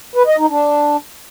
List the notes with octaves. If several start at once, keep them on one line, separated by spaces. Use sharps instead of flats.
B4
D#5
D#4
D4